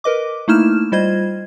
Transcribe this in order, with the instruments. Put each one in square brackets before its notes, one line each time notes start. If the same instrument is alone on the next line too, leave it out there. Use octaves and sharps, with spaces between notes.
[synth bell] A#4 B4 D#5 D6
A3 A#3 D#4 E4 F6 E7
G3 F4 C5 D#5 G#6